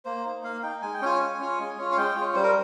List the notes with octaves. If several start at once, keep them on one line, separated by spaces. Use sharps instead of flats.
A#3 C5
D#4
A#3 F5
D#4 G5
G#3 G#5
G5
C#4 F4 G#5
G#3
C#4 F4
G#3
C#4 F4
F5
G#3 G5
C#4 F4
G3 C5
A#4